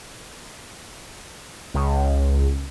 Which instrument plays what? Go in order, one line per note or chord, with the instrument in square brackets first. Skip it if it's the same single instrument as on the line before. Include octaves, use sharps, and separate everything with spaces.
[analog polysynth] C#2